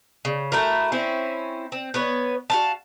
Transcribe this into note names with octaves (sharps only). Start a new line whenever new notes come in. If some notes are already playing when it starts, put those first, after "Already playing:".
C#3
A3 E4 F#4 A#4
C4 C#4 E4
C4
B3 B4 C#5
F#4 F5 A5